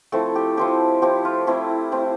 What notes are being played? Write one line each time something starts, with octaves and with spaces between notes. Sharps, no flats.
F3 A3 C4 E4 A4
G4
F3 C4 E4 G4
F3 C4 E4 G4
F4
A3 C4 E4
A3 C4 E4